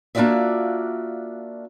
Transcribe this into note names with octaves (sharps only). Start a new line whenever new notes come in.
A#3 D4 F4 F#4 D5 E5